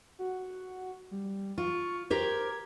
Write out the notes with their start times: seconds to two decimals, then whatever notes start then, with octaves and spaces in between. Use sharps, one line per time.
0.19 F#4
1.11 G3
1.58 F4 C#6
2.10 G4 A#4 C5 G#6